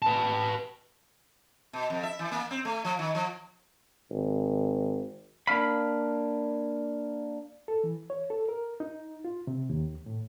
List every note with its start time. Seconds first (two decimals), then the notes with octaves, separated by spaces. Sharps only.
0.02 B4 A5
1.73 B2
1.90 F2
2.03 E5
2.19 E3
2.32 A#3
2.51 C4
2.65 A3
2.85 F3
2.99 D#3
3.15 F3
4.10 G#1
5.47 A#3 D4 F5 B5
7.68 A4
7.84 E3
8.10 C#5
8.30 A4
8.49 A#4
8.80 D#4
9.25 F4
9.47 C3
9.70 D#2
10.06 A2